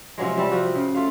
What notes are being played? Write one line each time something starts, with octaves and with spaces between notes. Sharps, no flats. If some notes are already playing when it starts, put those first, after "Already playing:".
C3 F3 F#3 G#3
G3 C4 G4 E5
F3 F#4 G5
C#3
A3 F4 F5